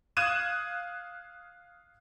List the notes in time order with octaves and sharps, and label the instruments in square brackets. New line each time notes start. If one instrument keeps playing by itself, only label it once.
[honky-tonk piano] F5 D#6 F#6 G#6 D#7 E7